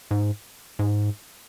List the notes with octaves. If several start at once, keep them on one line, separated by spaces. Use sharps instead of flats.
G#2
G#2